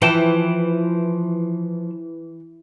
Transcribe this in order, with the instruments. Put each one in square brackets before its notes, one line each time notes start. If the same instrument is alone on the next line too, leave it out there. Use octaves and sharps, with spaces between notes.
[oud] E3 [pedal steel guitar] F3 G5 A5